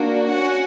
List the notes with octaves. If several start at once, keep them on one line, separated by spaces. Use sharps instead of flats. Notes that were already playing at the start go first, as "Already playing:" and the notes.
Already playing: A#3 D4 F#4
C#4 F#4 F#5